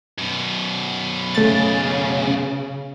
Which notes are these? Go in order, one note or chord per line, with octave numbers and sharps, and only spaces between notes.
F#2 B2
C#3 A3 A6